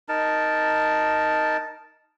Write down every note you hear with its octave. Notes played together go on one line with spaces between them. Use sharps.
D#4 A#4 A5